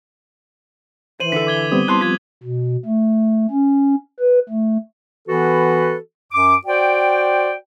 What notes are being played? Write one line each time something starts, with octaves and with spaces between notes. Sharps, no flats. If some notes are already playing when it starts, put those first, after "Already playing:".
E3 C5 D#7 F#7
D3 A4 B6
D6 G#6 G7
G3 B3 C4 D#6
E4 A5 C6 F#6 G7
F3 F4 G#6 B6
B2
A3
C#4
B4
A3
E3 B3 F#4 A4 B4
F#2 D6
F#4 C5 D5 G5